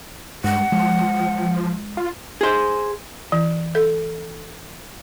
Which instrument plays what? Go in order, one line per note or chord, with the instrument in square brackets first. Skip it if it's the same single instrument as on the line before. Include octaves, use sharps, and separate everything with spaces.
[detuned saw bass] G2 [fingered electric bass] G#3 [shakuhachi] F#5
[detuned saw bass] F3 [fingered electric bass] G#3
[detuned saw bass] F4
[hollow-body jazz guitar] G#4 C5
[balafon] E3
A4